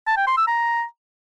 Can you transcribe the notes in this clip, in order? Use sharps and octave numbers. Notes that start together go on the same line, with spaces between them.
A5
G5
C6
E6
A#5